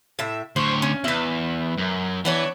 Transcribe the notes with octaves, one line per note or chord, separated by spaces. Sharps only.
A2 E5
D2 C5 C#5
C#4
E2 B4 E5
F#2
E3 B3 D4 C#5